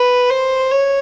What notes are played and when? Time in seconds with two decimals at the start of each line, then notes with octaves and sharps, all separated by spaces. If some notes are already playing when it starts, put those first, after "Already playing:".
Already playing: B4
0.30 C5
0.71 C#5